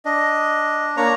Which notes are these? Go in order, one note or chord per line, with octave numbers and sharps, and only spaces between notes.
D4 D#5
A#3 D4 C#5 A#5